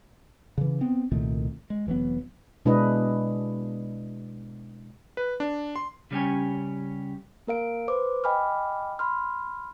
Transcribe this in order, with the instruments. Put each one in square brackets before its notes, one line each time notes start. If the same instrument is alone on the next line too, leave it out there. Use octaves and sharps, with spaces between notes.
[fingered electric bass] C#3 E3
B3 C4
C2 A#2 D#3 A3
G#3
F1 E3 F#3 B3
[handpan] B2 G#3 D4 E4 B4 D#5
[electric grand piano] B4
D4
C6
[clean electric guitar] C#3 G3 C#4 G4 C#5 G#5
[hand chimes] A#3 A#4 F5 D7
B4 C5 D6
D#5 G5 G#5 B5 D6 F6
B5 C6 F6